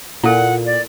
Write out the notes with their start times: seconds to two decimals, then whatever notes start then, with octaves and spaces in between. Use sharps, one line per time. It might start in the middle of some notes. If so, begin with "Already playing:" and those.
0.24 A#2 E4 A4 F#5
0.66 D5